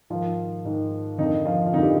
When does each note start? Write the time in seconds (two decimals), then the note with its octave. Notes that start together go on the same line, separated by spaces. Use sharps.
0.10 G#2 D#3 F3 F4
0.65 G#2 D#3
1.18 F2 D3 D#3 D#4
1.45 F3 F4
1.66 F4
1.73 F2 D3 D#3 D#4
1.82 G4